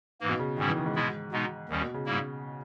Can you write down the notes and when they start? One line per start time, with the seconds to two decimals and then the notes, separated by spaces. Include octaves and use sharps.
0.21 G#2 E3 A#3
0.29 B2
0.39 C#3
0.57 G#2 D#3 G3 C#4 E4
0.67 E3
0.77 D#3
0.86 G#2
0.95 B2 G#3 B3 E4
1.32 B2 G#3 B3 D#4
1.69 D#2 D#3 G3 C#4
1.81 B2
1.94 C#3
2.06 G#2 G3 A#3 E4